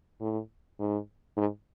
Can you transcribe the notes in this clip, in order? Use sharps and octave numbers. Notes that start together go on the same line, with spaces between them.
A2
G#2
G#2